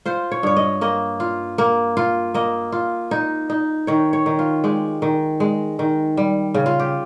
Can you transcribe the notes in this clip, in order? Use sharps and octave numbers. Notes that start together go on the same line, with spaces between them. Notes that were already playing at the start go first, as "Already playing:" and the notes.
F4 C5
C#5
G2 C#5
D#5
A#3 D#5
F4
A#3
F4
A#3 D#5
F4
D#4
D#4
D#3 C#5
C#5
D#3
F4
G#3 G4
D#3
G#3
D#3
G3
C#3
F4
G4